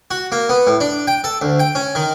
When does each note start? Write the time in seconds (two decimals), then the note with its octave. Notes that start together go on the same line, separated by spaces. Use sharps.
0.11 F#4
0.32 A#3
0.49 B3
0.67 A2
0.80 D4
1.07 G5
1.24 A4
1.42 D2
1.60 G5
1.75 C#4
1.95 D#3